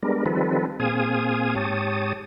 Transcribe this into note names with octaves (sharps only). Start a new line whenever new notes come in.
G3 G#3 B3 D4 A#4
D#3 F3 G3 C4 A4 B4
A#2 C4 G#4 F5 G#5 D#6
G#2 G4 C#5 A5 D#6